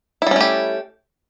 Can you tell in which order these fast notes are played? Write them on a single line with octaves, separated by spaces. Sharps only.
E4 G3 C#4 A3 G4